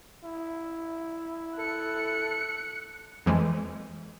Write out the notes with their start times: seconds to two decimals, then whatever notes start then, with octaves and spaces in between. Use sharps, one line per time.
0.24 E4
1.58 A4 F#6 C#7
3.26 F2 E3 F3 G#3